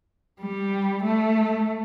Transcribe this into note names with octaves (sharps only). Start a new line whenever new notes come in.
G3
A3